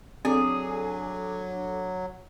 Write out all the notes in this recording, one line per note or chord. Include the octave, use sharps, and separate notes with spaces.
F#3 C4 D4 G#4 A4 D6